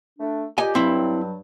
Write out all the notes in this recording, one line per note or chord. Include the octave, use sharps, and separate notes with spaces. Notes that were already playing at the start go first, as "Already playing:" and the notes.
A3 D4
A#2 G4 D#5 G#5
G2 F#3 C4 E4